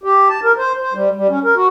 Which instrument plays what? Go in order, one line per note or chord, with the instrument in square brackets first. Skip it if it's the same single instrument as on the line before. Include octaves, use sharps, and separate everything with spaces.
[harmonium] G4
A5
A#4
C5
C5
G3
G3
C#4
A#4
F#4